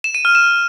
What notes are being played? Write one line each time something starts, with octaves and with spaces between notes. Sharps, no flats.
E7
D#7
F6
E7